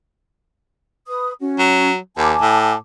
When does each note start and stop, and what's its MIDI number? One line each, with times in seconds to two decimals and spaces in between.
1.07 1.32 71
1.07 1.32 87
1.40 1.90 61
1.40 1.90 66
1.59 1.96 54
2.17 2.34 39
2.17 2.75 80
2.17 2.75 81
2.17 2.75 86
2.41 2.74 45